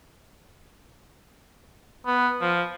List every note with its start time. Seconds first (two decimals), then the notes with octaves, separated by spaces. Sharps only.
2.06 B3
2.41 F3